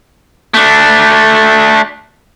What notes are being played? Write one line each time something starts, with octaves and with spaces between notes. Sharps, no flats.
A3 D4